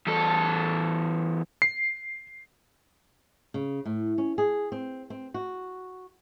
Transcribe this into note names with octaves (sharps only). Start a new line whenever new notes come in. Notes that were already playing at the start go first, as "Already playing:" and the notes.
E2 A4
C7
C#3
A2
C#4
G#4
C4
C4
F#4